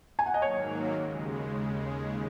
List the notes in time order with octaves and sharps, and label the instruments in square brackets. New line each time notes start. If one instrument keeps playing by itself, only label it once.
[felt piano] G#5
F#5
D#5
[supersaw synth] G#2 D#3 F#3 A#3 [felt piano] C#5
[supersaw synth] D#2 C#3 G#3